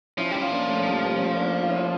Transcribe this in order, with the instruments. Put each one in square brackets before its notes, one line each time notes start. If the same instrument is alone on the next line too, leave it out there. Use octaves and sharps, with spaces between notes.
[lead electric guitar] F3 [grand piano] C#4 E4
[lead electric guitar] G3 [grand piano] C#4 E4
[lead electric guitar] F3
[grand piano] A#3 D4
A3 C#4
C#4
G3 A#3
G3 A#3
A3 C#4
A#3 D4
F4
C#4 E4